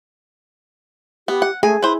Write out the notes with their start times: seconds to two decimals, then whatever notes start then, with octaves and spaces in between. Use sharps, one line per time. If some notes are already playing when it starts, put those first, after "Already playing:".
1.28 B3 G4
1.42 F#5
1.63 A3 G#4 G#5
1.83 E4 B4 C5